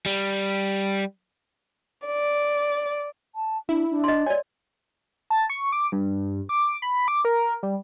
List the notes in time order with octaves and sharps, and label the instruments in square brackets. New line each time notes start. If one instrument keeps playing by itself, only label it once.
[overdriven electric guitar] G3
[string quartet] D5
[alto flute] A5
[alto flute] D4 [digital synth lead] E4
[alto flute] D4
[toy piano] D#5 C6
[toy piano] C#5 D5 [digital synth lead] G#5
[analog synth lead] A5
C#6
D6
G2
D6
B5
D6
A#4
G3